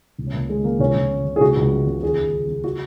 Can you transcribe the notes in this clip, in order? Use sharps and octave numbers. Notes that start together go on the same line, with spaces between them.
C#2
C#4
C#2 A#3
C#3 G#3
C#3 A#3
C#2 C#4
C#2
C#3
C#3
G#4
C#2 F#4
C#2
C#3
C#3
D#2 G#4
D#2
C#3
C#3
F#4